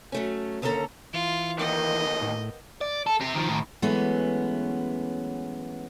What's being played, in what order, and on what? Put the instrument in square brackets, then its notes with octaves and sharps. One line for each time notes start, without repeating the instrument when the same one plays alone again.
[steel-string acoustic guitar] F#3 A3 C#4
D#2 D3 A#3 C#4 A4 A#5
[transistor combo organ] E3 [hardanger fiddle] F4
[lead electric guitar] D2 D#3 [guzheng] A#3 B3 G4 [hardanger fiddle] D#5
[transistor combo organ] A2
[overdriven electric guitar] D5
A4
C4 G4
D#3 F3
A2 D#3
[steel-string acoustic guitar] E3 F#3 G#3 A3 B3 C#4